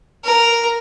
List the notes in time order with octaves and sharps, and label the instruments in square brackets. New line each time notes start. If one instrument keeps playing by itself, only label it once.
[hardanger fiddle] A#4